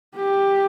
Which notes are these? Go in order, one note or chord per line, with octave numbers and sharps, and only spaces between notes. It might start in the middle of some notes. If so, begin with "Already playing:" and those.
G4